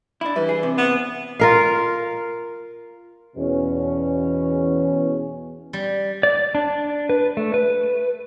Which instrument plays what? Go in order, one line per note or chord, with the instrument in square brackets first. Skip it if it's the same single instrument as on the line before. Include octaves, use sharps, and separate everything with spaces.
[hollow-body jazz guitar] D4 E4
[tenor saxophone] E3 [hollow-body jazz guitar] G3
[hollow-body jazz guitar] G#4
C3
[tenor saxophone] B3
[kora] F4 A#4 F5
[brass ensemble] E2 B2 C#4
[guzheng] G3
[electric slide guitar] D5
D4
B4
A3
B4